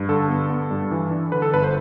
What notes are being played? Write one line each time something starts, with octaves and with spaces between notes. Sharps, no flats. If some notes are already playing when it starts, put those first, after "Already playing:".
Already playing: G2
D3 A4
B3
B3
G2
E3
D4
D3 B4
A4
G1 B4
C5